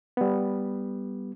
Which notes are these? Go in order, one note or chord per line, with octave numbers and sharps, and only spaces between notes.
G3 B3